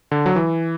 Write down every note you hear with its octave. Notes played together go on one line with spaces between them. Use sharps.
D3
F#3
E3